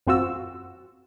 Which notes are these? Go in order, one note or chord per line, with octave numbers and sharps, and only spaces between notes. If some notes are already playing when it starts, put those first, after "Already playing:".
F#2 C4 F4 F#4 E6